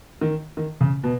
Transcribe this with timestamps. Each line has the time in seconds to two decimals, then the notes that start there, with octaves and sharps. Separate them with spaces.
0.21 D#3
0.57 D#3
0.81 C#3
1.04 B2